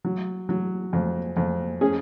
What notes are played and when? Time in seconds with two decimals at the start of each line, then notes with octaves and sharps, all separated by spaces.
0.04 F#3
0.49 F#3
0.93 F2
1.37 F2
1.81 C#4 G#4